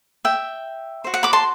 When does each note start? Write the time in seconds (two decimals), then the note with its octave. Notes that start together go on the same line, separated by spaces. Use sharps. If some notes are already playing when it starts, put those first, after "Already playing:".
0.25 E5 G5
1.04 F#4 C5
1.14 F#5
1.23 B5 D6
1.33 A5 C6